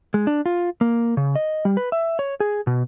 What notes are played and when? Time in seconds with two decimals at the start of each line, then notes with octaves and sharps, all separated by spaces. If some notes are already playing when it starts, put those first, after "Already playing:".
0.14 G#3
0.27 D4
0.46 F4
0.81 A#3
1.17 C#3
1.36 D#5
1.65 G3
1.77 B4
1.92 E5
2.19 C#5
2.40 G#4
2.67 B2